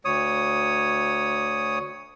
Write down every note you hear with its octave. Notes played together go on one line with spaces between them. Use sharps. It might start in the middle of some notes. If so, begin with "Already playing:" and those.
D2 C#5 D#6